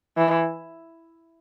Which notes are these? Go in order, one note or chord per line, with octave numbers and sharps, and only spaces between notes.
E3